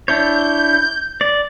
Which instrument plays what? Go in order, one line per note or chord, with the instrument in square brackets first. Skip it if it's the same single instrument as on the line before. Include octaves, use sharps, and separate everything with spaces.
[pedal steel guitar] D4 E4 C#5 [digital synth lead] G6
[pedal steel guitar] D5